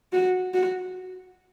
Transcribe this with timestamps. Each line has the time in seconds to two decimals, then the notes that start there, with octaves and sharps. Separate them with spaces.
0.13 F#4
0.54 F#4